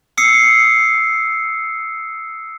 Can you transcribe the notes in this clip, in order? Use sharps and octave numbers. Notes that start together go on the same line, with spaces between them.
D#6 E6 C7 C#7